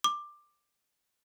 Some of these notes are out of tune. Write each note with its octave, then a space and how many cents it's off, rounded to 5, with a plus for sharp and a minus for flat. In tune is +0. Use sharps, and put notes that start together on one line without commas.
D6 +15